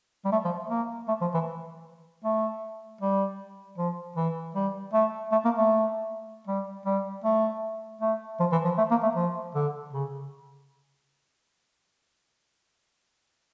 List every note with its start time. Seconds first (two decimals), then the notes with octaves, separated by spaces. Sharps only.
0.25 G3
0.32 A3
0.45 F3
0.70 A#3
1.08 A3
1.21 F3
1.34 E3
2.24 A3
3.01 G3
3.78 F3
4.17 E3
4.55 G3
4.93 A3
5.32 A3
5.45 A#3
5.58 A3
6.47 G3
6.86 G3
7.24 A3
8.02 A3
8.40 F3
8.52 E3
8.65 F3
8.78 A3
8.91 A#3
9.03 A3
9.16 F3
9.55 D3
9.93 C#3